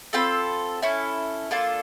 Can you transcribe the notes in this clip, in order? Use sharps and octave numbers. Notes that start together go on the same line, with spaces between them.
C4 F4 A4 B5
C#4 E4 A4
A#3 D4 F4 A4